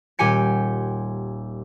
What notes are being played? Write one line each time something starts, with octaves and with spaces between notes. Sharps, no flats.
D#1 G4 G#5 C#7